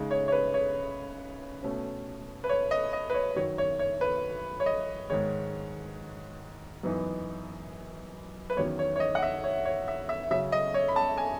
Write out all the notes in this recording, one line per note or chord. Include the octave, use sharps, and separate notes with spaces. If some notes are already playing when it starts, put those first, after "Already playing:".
Already playing: C#3 G#3 D#4
C#5
C#5
B4
C#5
B2 A3 C#4
B4
C#5
D#5
D#5
B4
C#5
F#2 D#3 F#3 C#5
C#5
C#5
B4
C#5
D#5
G#2 D#3 G#3 C#5
F#2 E3 B3 D#4
B4
E2 D#3 F#3 C#4 C#5
C#5
C#5
D#5
F#5
E5
C#5
C#5
E5
E5
C#3 F#3 C#4 E5
D#5
C#5
B5
A5
G#5